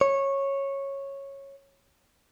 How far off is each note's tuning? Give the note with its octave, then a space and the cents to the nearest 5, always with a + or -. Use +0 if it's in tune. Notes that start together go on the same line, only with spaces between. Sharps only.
C#5 -10